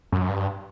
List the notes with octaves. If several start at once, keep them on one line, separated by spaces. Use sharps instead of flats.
F#2
G2